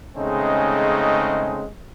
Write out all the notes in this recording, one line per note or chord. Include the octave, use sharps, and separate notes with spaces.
C#3 G#3 A3 C4 C#4 D#4